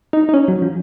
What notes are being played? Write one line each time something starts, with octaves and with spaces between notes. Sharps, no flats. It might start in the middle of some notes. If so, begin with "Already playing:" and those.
D#4
D#4
C#4
F#3
F3